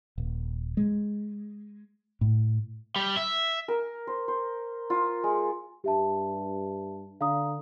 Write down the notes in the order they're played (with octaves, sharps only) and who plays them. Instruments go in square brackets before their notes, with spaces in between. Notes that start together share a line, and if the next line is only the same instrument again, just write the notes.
[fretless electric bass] D#1
G#3
A2
[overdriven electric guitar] G3
E5
[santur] A#4
C5
C5
F4
G#3
[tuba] G2 [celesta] G4 E5 A5
[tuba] D3 [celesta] F5 A#5 D#6